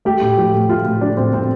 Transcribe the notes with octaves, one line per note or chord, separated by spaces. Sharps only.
A3 G4
A2
F3
A2
A3 F4
A2
F3 D4
A2 C4
A3 C4